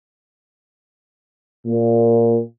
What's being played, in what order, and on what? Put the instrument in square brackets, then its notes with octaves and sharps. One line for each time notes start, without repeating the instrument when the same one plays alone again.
[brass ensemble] A#2